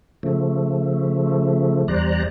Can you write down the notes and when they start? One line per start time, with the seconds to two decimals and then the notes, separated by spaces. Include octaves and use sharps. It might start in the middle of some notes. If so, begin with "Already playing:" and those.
0.23 C#3 F3 A3
1.88 E2 G3 C5 D5 A#5 F#6